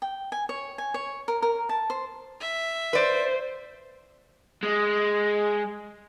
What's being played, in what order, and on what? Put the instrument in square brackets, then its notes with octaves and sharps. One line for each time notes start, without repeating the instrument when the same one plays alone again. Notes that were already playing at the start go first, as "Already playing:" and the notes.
[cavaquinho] G5
G#5
C#5
G#5
C#5
A#4
A#4
A5
C5
[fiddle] E5
[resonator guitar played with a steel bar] B4 D5 [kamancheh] C5
[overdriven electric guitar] G#3